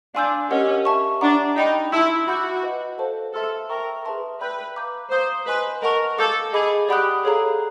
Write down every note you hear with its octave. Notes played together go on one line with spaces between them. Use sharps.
D4 F5 G#5 C6 E6 G6
C#4 G4 A#4 D#5 F#5
E5 A5 C#6
D4 F#5 A#5 D6
D#4 D5 G5 B5
E4 E5 A5 C6 E6
F#4 F#5 B5 D6 G6
B4 D#5 F#5
A4 C5 F5 A5
A4 E5 A5 C6 F6
A#4 E5 G5 A#5 C#6
G#4 B4 E5 A5 C6
B4 D5 G5 B5 E6 G6
F5 A#5 D6 G6
C5 F5 A#5 D#6 G6
B4 D#5 G#5 C6
A#4 D#5 F#5 A5 C#6
A4 F5 A5 D6 G6
G#4 D#5 G#5 B5 D6
G4 D5 F#5 B5 D#6 F#6
G#4 A4 C#5 F5 A#5